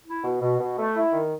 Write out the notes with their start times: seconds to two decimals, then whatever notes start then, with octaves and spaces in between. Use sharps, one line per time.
0.07 E4
0.24 B2
0.42 B2
0.60 B2
0.78 A3
0.95 E4
1.13 D#3